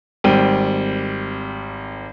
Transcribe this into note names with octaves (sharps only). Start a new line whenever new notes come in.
G#1 G3 C4 G5 D#7